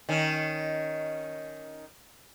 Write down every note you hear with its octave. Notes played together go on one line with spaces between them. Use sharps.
D#3 C#4